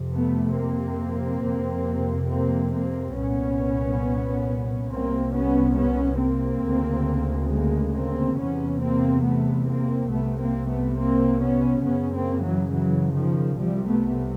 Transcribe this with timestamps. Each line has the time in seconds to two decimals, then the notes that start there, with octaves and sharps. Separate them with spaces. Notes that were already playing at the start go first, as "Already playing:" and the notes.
Already playing: F2 C3
0.13 A3 B3
0.57 A#3 C4
1.43 F2 C3
2.30 A#3 C4
2.74 A#3 C4
3.17 C2 A#2 B3 C#4
4.90 C2 C3 A#3 C4
5.34 B3 C#4
5.77 B3 C#4
6.20 A#3 C4
6.65 D2 C#3
7.51 G#3 A#3
7.94 A#3 C4
8.38 E2 C3 B3 C#4
8.81 A#3 C4
9.25 A3 B3
9.68 A#3 C4
10.11 C2 C3 A3 B3
10.41 A#3 C4
10.70 A3 B3
10.98 A#3 C4
11.42 B3 C#4
11.85 F#2 C#3 B3 C#4
12.14 A#3 C4
12.43 E3 F#3
12.72 E3 F#3
13.15 D#3 F3
13.59 C2 C3 F3 G3
13.88 A3 B3